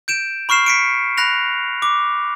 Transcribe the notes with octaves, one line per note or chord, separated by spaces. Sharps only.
G6 D7 E7
B5 C#6 F6 C7 E7
B6 C#7 D7
B5 F#6 A#6 F7
D6